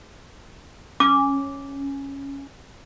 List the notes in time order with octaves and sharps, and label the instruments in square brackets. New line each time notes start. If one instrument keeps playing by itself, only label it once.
[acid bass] C#4 [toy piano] D6